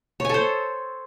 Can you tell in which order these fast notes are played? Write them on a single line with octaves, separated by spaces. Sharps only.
C#5 G#5 A4 C5